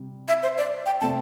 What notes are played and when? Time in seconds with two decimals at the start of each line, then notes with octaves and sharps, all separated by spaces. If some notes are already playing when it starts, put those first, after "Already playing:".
Already playing: C3 G3
0.28 E5
0.43 C5
0.58 D5
0.86 G5
1.01 C3 A3 C4 A5